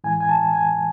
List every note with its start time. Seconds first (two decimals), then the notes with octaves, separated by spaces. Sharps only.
0.04 A2 E3 G#3 G#5
0.20 G#5
0.29 A5
0.54 G#5